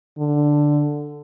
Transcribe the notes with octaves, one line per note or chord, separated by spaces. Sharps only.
D3